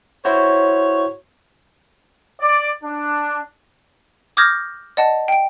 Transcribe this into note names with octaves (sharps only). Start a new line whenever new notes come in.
E4 F#4 C5 C#5
D5
D4
D6 D#6 F6 G6 G#6 A#6
D5 D#5 F#5 A5
G5 D7